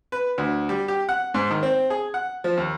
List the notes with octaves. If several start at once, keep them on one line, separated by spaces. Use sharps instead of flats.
B4
D2
G3
G4
F#5
G#2
D#3
C4
G#4
F#5
F3
D#2